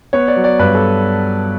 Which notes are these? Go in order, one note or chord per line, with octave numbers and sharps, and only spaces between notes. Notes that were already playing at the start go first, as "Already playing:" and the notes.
B3 C#5
D5
F#3
D5
G2 B4
A4